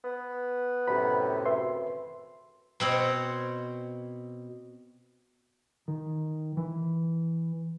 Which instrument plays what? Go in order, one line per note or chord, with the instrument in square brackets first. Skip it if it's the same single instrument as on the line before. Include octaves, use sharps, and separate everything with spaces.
[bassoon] B3
[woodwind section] F#2 A2 C3 [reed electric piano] B5
[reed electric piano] B4 E5 C6
[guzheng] B2 C4 C#5
[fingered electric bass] D#3
E3